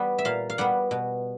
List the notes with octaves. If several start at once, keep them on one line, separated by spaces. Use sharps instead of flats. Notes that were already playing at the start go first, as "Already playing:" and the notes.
Already playing: G3 B3
E5
A#2 F5
F5
G3 B3 F#5
B2